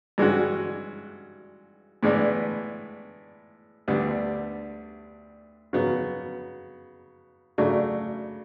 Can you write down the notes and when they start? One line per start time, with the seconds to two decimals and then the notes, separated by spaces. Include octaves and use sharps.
0.18 G2 E3 G#3 C#4 F#4
2.03 A2 E3 G#3 B3 D4
3.88 D2 D3 G3 B3 D4
5.73 C#3 F#3 B3
7.58 C#3 F#3 A3 D4